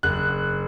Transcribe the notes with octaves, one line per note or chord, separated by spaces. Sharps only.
F#1 F#6